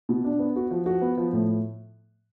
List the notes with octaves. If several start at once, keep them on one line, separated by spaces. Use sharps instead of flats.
B2
D4
B3
F#4
F3
F#4
B3
F3
A2